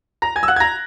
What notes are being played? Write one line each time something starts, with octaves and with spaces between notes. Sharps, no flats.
A#5 A#6
G#5 G#6
E6
F#5 F#6
G#6
A#5 A#6